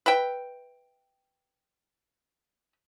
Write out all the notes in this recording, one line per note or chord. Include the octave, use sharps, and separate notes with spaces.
B4 E5 G5